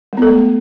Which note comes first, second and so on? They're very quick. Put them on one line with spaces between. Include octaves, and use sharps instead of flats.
G#3 B3 A4 A3